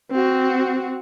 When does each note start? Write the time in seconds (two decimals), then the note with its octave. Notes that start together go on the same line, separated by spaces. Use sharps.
0.11 C4 F#4